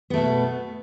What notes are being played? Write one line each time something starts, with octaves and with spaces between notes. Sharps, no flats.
B2 A3 B3